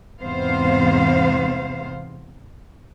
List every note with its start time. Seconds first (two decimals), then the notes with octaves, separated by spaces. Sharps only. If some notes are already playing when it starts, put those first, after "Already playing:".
0.21 E2 G#2 C3 B3 C5 F5